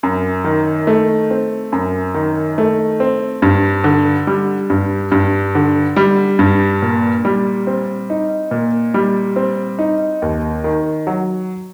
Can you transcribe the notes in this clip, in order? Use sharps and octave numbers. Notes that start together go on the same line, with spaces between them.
F#2
D#3
A3
C4
F#2
D#3
A3
C4
G2
D3
G3
G2
G2
D3
G3
G2
A#2
G3
C4
D#4
A#2
G3
C4
D#4
D#2
D#3
F#3